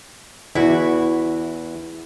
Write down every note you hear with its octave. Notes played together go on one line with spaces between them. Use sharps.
E2 E4 F#4